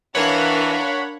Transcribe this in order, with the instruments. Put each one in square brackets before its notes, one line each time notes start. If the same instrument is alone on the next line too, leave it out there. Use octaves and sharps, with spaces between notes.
[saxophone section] E3 B4 [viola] D4 [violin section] A#4 F5 [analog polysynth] C#5 F#5 B5